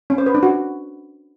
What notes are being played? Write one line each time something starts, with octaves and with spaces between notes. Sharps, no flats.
C#4
C5
B4
D4
F#4